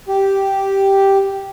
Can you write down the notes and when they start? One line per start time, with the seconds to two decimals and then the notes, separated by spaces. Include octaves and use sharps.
0.09 G4